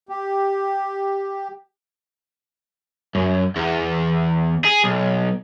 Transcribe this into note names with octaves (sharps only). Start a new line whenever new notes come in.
G4
F#2
E2
G#4
B1